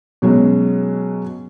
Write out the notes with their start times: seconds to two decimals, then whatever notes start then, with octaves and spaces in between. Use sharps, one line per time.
0.22 B2 F#3 G#3 C#4